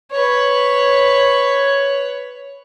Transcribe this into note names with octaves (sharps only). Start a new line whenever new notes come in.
B4 C#5